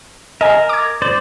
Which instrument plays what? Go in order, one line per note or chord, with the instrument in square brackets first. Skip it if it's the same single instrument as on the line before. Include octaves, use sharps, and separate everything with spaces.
[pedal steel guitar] A#4 [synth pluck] D#5 G#5
[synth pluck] D6 G#6
[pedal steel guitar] C5 D5